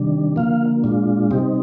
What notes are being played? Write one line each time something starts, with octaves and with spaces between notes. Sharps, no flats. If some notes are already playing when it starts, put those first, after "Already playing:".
Already playing: C3 D#3 G3 D4
D3 F3 A#3 F5
A#2 G#3 D4 F4
C3 G3 C4 D#4 G4